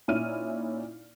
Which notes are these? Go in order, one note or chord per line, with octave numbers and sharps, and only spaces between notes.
A#2 C#4 D#4 E4 F6 D#7